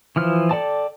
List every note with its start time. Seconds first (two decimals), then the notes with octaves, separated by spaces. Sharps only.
0.16 E3 F3 F6
0.51 A4 D5 G5 A5